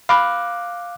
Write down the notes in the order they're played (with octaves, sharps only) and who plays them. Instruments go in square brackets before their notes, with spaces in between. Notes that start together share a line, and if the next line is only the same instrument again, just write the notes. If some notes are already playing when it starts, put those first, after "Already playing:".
[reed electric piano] F5 D6 F#6 [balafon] B5